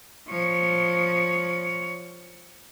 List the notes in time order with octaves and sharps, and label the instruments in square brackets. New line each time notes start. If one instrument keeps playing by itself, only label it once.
[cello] F3 C#5